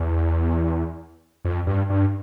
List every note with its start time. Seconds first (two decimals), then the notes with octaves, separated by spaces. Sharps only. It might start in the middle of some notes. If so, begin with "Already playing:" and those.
Already playing: E2
1.45 F2
1.67 G2
1.90 G2